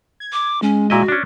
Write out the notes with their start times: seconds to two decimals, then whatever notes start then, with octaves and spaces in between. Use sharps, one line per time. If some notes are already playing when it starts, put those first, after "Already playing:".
0.20 G#6
0.32 D6
0.62 G#3 C#4
0.90 A#2 E4 F#4 D#5
1.08 C#4 D4